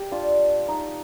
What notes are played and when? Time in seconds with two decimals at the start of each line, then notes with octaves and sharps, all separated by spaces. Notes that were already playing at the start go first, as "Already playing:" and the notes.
Already playing: G4
0.11 D4 F4
0.68 D#4